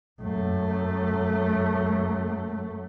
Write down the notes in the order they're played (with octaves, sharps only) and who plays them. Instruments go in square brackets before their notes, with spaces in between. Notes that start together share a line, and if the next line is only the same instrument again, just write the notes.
[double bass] F#2 A3